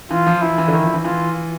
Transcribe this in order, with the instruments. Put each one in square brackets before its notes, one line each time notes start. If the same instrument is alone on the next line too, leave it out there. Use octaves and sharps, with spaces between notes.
[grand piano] E3 [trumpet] F4
[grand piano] F3
[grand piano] E3 [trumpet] E4
[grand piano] E3
D3
D#3
F3
E3
[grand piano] E3 [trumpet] F4